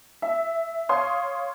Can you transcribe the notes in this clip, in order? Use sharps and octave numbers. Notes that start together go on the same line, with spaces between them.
E5
C#5 F5 C6 D#6